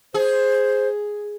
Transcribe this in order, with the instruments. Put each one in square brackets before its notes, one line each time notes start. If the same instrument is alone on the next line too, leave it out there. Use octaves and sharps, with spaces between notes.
[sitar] G#4 [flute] C5